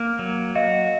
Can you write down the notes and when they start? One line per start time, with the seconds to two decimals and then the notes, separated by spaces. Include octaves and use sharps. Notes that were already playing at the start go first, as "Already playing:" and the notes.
Already playing: A#3
0.19 F#3
0.55 F#4 D#5 F5